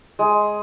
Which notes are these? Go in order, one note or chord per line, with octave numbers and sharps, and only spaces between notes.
G#3